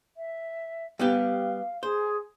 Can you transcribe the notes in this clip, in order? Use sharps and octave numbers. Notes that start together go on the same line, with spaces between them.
E5
G3 B3 G4 F5
G#4 C5